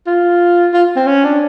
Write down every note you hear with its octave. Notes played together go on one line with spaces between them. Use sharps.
F4
F4
C4
C#4
D4